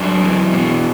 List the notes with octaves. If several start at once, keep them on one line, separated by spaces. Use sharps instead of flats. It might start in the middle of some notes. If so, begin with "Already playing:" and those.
Already playing: F#2 D4
E3
B2